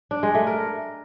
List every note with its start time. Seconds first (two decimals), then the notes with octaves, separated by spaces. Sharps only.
0.11 D4
0.23 G#3
0.35 A3
0.47 A#4